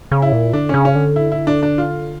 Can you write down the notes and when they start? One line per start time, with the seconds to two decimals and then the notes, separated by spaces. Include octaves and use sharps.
0.11 C#3
0.22 E4
0.32 A#2
0.53 D3 D4
0.69 C#3 C#4
0.85 C#4
0.95 D3
1.16 E4
1.32 E4
1.47 D4
1.63 D4
1.78 F4